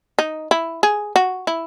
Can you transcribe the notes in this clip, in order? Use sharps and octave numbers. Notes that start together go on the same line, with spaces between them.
D#4
E4
G#4
F#4
E4